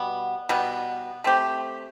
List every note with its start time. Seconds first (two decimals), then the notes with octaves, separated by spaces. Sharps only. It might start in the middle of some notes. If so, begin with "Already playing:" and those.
Already playing: B2 G3 B3
0.49 B2 G3 B3
1.24 A3 C4 G4